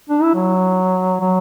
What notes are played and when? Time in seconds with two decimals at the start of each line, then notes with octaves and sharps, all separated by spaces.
0.10 D4
0.22 E4
0.35 F#3
1.21 F#3